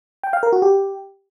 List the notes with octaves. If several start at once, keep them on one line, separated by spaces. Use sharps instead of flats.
G5
F5
A#4
F#4
G4